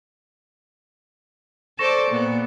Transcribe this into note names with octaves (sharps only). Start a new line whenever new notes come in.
A4 C5 D5 C#6 A#6 E7
A#2 B3